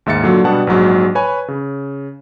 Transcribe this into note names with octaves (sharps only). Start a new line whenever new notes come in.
D#2 G#2 E5 A6 C#7
A#2 D3 F#3
B2 G3 B3 D4 F#5 A5
A#1 G#2 F#3
B4 C#5 G#5 B5
C#3